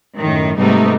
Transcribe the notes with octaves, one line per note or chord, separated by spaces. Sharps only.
F#2 A2 D#3
G#2 C3 G3 A3 B3 D#4